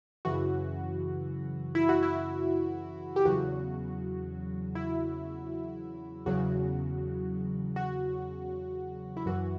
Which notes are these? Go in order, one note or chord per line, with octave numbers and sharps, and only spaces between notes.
F#2 C#3 E3 F#4
E4
F#4
E4
G4
E2 C#3 F#3 F#4
E4
E2 C#3 F#3 F#4
F#4
E4
F#2 E3 F#4